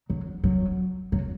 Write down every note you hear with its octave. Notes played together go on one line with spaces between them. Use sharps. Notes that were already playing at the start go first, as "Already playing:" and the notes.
F#3
F#3
F#3